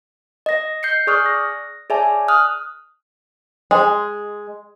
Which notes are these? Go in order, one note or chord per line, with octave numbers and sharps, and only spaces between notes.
D#5 A#6
G6 C7 C#7
G#4 D5 C#6 D#6 F6 F#6
A#6
G#4 C#5 D5 E5 G#5 A5
D#6 F6 F#6
G#3